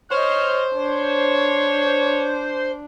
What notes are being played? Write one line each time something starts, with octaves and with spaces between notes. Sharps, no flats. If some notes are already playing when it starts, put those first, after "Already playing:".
C5 C#5 D#5 F6
D4 C#5